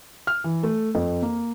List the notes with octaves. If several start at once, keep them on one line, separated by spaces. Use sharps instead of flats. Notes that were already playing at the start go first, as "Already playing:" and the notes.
F6
E3
A3
F2
A#3